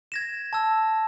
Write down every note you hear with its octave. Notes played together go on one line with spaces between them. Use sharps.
G#6 A#6 E7
A5 E6